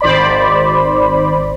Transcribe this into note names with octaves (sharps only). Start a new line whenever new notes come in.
G#1 C5 D5 B5